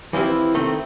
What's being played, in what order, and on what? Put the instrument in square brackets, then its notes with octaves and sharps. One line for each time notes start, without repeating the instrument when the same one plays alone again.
[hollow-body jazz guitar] E3 F3 C4 E4 G4
D#3 A3 C4